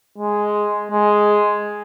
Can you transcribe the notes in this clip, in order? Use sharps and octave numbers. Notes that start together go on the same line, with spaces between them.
G#3
G#3